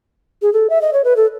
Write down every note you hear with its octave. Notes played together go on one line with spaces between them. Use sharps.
G#4
A4
E5
D#5
C#5
B4
A4